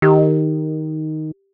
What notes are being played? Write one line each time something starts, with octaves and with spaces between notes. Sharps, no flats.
D#3 G4